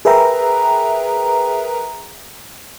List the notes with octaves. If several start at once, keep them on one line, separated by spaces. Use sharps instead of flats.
G#4 A#4 B4 E5 G5 A#5